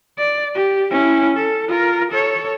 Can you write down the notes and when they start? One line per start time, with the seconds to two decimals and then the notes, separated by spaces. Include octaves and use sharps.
0.18 D5
0.55 G4
0.91 C#4 E4
1.37 A4
1.68 F4 A#4
2.11 A4 C#5